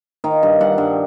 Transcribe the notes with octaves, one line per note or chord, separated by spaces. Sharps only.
D#3 F5
G2
G2 F#5
G2